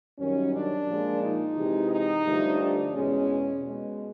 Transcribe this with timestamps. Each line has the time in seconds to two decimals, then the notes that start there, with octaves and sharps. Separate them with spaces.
0.19 F#2 D#3 G3 C#4
0.54 D4
0.88 A#2 F3 G#3
1.22 D#4
1.56 C3 E3 G#3
1.91 D#4
2.25 G2 D3 F3 A3
2.60 D4
2.94 E2 B2 G#3 C#4
3.62 B2 G#3